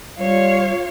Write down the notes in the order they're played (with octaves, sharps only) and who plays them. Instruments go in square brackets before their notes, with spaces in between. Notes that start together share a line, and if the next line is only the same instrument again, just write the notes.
[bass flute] G3 [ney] F4 [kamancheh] C#5 F5